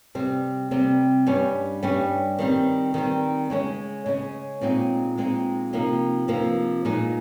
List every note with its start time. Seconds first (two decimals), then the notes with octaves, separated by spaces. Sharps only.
0.15 C3 G3 C4
0.71 C3 G3 C4
1.27 G2 G3 C#4
1.83 G2 G3 C#4
2.39 D#3 G3 C4
2.94 D#3 G3 C4
3.50 C#3 G#3 C#4
4.06 C#3 G#3 C#4
4.61 A#2 G#3 C4 D#4
5.18 A#2 G#3 C4 D#4
5.73 C3 F3 A#3 D#4
6.28 C3 F3 A#3 D#4
6.85 A#2 G#3 D#4